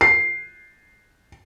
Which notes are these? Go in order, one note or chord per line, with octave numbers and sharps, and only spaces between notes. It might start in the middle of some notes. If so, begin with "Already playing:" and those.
C7